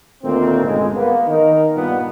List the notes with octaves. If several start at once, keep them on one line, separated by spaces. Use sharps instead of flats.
D2 A#2 D#3 A3 A#3 C4
G1 B2 G#3 C#4
A#3 B3
D#3 D#4 A#4
G2 A#2 G3 A#3 B3